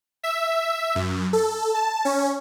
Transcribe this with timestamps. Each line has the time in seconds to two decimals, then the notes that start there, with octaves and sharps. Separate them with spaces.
0.23 E5
0.95 F#2
1.33 A4
1.74 A5
2.05 C#4